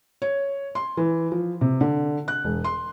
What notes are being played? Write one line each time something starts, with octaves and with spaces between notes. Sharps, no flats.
C#5
C6
E3
F3
C3
D3
F#6
E1
C6